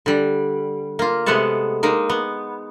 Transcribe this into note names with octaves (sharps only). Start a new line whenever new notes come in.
D3 G3
A#3 F4
C3 G#3 A3 B3 F#5 A5
G#3 A#3 D#4
B3